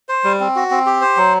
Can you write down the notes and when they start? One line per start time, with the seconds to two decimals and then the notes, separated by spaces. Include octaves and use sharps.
0.09 C5
0.24 G3
0.40 C4
0.56 F#4
0.71 C4
0.86 G4
1.01 C5
1.17 F#3